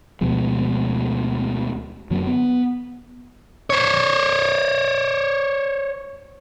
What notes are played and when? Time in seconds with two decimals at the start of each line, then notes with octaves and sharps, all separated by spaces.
0.21 D2 B2 F3 G#3
2.10 F#2 D3 F#3 A#3
2.27 B3
3.70 C5 C#5